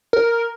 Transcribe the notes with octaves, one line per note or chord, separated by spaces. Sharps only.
A#4